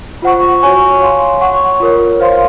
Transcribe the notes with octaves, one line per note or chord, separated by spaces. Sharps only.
F4 C5 F#5 C#6
F#4 C#5 G#5 C#6
C#5 F5 G#5 C6
C#5 F#5 C#6
F4 A#4 C#5
C5 F5 C6